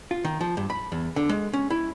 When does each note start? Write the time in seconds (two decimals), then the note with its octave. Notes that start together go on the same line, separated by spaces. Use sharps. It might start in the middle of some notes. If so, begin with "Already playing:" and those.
0.11 F4
0.25 D#3
0.41 F3
0.57 G2
0.70 B5
0.92 E2
1.16 D3
1.29 G#3
1.53 C#4
1.70 E4